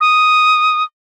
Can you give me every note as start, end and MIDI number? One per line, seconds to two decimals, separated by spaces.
0.01 0.83 87